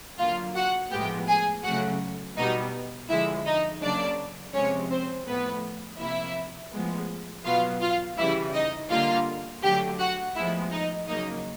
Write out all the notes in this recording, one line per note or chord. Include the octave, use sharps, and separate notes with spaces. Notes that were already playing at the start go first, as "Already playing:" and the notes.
D3 F#3 A#3 F4 F5
F#4 F#5
A2 F3 G#3 B3 G4 G5
G#4 G#5
C#3 F#3 A3 F#4 F#5
B2 G3 B3 D#4 D#5
D3 F3 G#3 E4 E5
D#4 D#5
C#3 F#3 A#3 D4 D5
C3 F3 G#3 C#4 C#5
C4 C5
A2 F3 A3 B3 B4
C3 F3 A#3 E4 E5
A2 F3 G#3 B3
B2 F#3 B3 F4 F5
F4 F5
C#3 E3 G3 E4 E5
D#4 D#5
D3 G3 A#3 F4 F5
D3 F#3 A3 G4 G5
F#4 F#5
A2 F3 G#3 B3 E4 E5
D#4 D#5
C#3 F#3 A#3 D#4 D#5